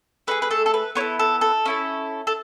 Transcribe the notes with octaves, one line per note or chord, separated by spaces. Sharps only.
A3 D#4 G#4 B4
B4
A4
A4
B4
B3 E4 A4 C#5
A4
A4
C#4 E4 A4
A4